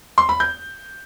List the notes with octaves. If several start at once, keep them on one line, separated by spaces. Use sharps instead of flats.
C6
B5
G6